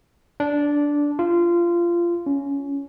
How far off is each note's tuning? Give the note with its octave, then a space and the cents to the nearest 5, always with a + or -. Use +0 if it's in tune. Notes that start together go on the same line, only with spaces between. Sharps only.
D4 -10
F4 -20
C#4 +15